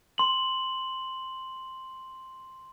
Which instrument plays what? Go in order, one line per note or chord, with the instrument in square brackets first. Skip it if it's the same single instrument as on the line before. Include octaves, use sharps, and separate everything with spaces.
[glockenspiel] C6 F#7